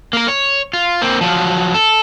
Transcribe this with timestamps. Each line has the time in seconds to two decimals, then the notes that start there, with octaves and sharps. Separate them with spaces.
0.13 A#3 A#4
0.28 C#5
0.73 F4
1.02 A#3 C4
1.21 F3 F#3
1.74 A4